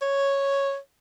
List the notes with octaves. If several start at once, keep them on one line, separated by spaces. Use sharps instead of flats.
C#5